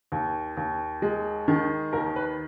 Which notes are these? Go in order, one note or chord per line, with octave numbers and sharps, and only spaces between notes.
D#2
D#2
G#3
D#3
D#2 A#4
B4